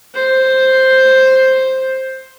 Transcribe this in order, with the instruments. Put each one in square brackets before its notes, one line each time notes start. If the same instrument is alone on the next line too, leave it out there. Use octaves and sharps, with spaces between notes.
[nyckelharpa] C5